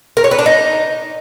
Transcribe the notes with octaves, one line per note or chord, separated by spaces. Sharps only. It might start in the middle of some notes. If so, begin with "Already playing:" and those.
A#4
C#5
B4
D4
D#4